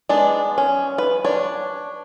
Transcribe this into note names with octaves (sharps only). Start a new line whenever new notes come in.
G#3 B3 D4
C#4
B4
D4 C#5